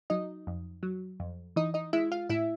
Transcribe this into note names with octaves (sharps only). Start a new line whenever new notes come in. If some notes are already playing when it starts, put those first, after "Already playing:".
F#3 D#4 D#5
F2
F#3
F2
E3 D#4 D#5
D#4 D#5
G#3 E4 E5
F4 F5
A2 E4 E5